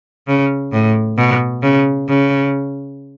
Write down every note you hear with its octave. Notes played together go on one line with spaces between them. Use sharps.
C#3
A2
B2
C#3
C#3